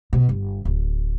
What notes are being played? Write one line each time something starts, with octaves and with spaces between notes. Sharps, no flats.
B2
G1
D1